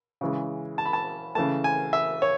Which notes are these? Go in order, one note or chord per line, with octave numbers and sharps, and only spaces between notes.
C#3 E3 G#3
A5
B5
A5
C#3 E3 A3 A5
G#5
E5
C#5